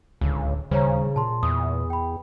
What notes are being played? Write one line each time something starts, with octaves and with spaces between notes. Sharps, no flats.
D1 C#2 D3
D1 D#2 C#3 G3 C5 C#5 A#5
A#2 A5 C6
E2 D#6
G5 B5